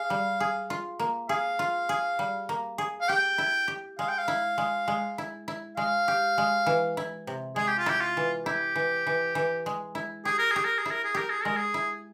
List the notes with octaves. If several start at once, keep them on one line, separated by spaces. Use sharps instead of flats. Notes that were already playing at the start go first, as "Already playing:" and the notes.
Already playing: G#4 F5
G3
G#4
F4
A#3
G#4 F5
F4
G#4
G3
A#3
G#4
F5
G4 G5
E4
G4
G#3 F5
G5
F5
E4
G#3
G#3
E4
E4
G#3 F5
G4
G#3
E3
E4
C3
G#3 G#4
G4
F4
E4 G4
F4
E3
E4 G4
E3
E3
E3
G#3
E4
G4 G#4
A#4
G4 G#4
A#4
G#4
E4
A#4
G#4
G4 A#4
G#4
G#3 A#4
G#4
E4